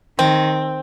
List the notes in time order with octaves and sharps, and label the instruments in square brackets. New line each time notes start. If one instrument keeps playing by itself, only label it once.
[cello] D#3 [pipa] C4